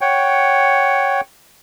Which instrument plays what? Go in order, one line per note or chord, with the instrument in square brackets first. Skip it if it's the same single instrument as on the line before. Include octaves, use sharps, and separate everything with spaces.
[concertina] C#5 F#5 G5